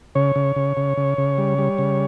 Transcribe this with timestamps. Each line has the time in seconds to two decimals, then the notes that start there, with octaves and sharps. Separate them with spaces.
0.15 C#3 C#5
0.36 C#3
0.56 C#3
0.77 C#3
0.97 C#3
1.18 C#3
1.38 G3
1.58 G3
1.78 C#3